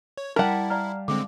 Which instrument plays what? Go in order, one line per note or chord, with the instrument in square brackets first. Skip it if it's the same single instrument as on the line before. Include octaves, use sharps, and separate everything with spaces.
[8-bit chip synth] C#5
[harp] G3 A5 B6 [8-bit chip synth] E4 [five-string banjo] A#4 F#5
[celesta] D5 A#5 F6 [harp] F5
[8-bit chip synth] D3 G#3 C4 [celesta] D6